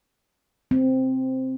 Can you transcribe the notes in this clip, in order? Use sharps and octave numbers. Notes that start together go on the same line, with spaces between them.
C4